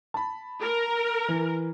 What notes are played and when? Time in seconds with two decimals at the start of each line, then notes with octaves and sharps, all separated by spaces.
0.14 A5 B5
0.62 A#4
1.28 E3